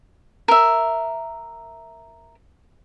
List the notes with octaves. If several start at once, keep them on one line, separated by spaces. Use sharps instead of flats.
A#4 E5